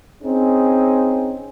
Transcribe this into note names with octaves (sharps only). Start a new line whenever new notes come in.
C4 C#4 D#4 G#4